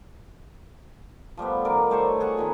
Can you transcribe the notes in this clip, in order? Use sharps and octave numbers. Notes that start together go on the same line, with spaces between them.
F3 G3 A3 B3
D#3 A#4 D5
G3 A3 C5 C#5
G#4 A4 F#5
A#2 D#3 B3